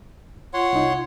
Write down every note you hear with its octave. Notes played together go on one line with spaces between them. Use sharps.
F4 C#5 F#5 C6
C2 D#4